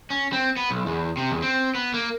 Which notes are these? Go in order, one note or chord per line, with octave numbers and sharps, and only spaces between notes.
C#4
C4
B3
B1
E2
C3
E2
C4
B3
A#3